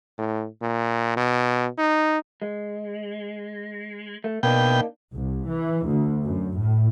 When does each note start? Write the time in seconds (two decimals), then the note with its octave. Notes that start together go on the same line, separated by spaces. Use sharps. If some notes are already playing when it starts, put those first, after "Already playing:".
0.18 A2
0.62 A#2
1.17 B2
1.78 D#4
2.42 G#3
4.24 A3
4.43 B2 A#3 D4 D#4 G5
5.14 C2
5.49 E3
5.87 D2
6.25 F#2
6.58 A2